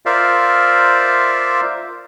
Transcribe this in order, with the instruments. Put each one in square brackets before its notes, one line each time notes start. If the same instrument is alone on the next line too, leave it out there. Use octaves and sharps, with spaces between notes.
[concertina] F4 A#4 C5 D5 E5 F5